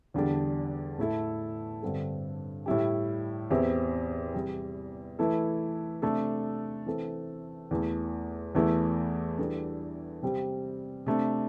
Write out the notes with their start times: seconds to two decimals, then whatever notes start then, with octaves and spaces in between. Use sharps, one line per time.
0.14 E2 D3 G3 D4
0.99 A2 A3 E4 A4
1.82 G2 D3 G3 C4 A4
2.66 A2 G3 E4 G4
3.50 E2 E3 C4 E4 G4
4.34 C3 E3 G3
5.19 E3 A3 E4 A4
6.02 C3 A3 D4 A4
6.86 E3 C4 A4
7.71 E2 E3 A3
8.55 E2 E3 A3 E4
9.39 E3 G3 D4 A4
10.22 C3 G3 C4 G4
11.06 C3 A3 D4